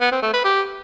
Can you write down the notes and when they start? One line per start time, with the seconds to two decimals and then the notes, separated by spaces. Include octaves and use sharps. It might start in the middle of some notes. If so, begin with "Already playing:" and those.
0.01 B3
0.12 C4
0.23 A3
0.33 B4
0.44 G4